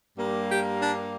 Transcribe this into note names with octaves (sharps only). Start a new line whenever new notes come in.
G2 G3 A#3
G4
D4